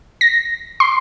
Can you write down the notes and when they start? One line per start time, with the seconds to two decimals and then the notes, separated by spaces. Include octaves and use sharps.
0.21 A#6
0.80 C6